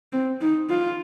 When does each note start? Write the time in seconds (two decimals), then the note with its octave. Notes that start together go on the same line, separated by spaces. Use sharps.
0.13 C4
0.41 D#4
0.70 F4